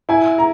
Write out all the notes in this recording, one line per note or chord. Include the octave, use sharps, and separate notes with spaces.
E4 G#5
A#5